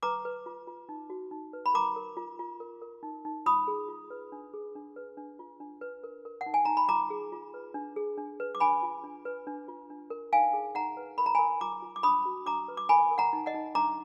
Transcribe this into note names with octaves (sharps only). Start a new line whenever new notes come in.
B4 A#5 D6
B4
F4
F4
D#4
F#4
D#4
B4
B5
A#4 A#5 D6
A#4
F4
F4
A#4
A#4
D#4
D#4
F4 B5 D#6
G#4
F4
B4
D4
G#4
D4
B4
D4
F4
D4
B4
A#4
A#4
F#5
D#4
G#5
D#4 A#5
B5
F4 A#5 D6
G#4
F4
B4
D4
G#4
D4
B4
D6
D4 G#5 B5
F4
D4
B4
D4
F4
D4
A#4
D#4 F5 G#5
G#4
D#4 F#5 A#5
B4
A#4 B5
A#5
A#4 G#5 B5
F4 A#5 D6
F4
D6
D4 B5 D#6
F#4
D4 A#5 D6
B4
D6
A#4 G#5 B5
A#4
F#5 A#5
D#4
D#5 F#5
D#4
D4 A#5 D6